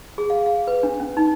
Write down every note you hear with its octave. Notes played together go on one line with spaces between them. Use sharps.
G#4
F5
F5
B4
D4
C#4
D#4